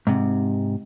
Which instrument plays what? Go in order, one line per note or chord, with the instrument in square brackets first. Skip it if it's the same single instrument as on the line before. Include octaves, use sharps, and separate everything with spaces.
[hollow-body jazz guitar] G#2 C3